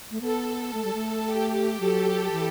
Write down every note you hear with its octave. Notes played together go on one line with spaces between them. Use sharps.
A3
B3 A4
A3
G3
A3
G4
F#3 A4
E3